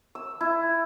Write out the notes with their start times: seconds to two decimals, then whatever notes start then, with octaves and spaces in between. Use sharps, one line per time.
0.15 E6
0.41 E4